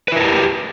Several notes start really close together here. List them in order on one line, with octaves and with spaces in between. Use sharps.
B4 E4 A#4 A5 G4